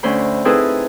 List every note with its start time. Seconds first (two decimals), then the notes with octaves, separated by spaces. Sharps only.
0.03 D2 C#4 C5 B5
0.45 C4 D#4 E4 G#4 A4 B4